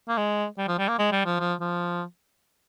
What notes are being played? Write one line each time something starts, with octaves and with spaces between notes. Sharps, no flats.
A#3
G#3
G3
F3
G3
A#3
G#3
G3
F3
F3
F3